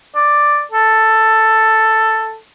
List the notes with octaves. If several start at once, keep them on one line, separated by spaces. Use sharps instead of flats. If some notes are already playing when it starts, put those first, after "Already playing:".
D5
A4